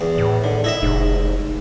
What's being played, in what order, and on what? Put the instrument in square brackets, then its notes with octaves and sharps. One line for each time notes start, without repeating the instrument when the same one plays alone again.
[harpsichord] E2
[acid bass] A2
[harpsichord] D3 [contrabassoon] D#3
[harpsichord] E4 D#5 E5
[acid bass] F1 [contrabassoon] G#2